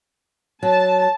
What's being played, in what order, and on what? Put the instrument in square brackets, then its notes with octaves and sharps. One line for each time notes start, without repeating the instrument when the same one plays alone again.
[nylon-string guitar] F#3 [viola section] A5